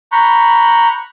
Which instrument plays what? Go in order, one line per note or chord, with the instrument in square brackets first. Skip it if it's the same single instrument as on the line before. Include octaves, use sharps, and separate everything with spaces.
[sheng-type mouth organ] A#5 B5 C#6 F#6 G6